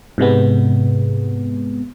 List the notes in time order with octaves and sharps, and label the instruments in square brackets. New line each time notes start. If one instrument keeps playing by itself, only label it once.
[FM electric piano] G#2 C3 G#3 B3